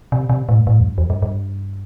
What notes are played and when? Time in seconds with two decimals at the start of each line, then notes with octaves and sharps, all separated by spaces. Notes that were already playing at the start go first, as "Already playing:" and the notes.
0.12 C3
0.29 C3
0.49 A2
0.60 G2
0.67 A2
0.80 E2
0.85 G2
0.98 E2
1.10 G2
1.22 G2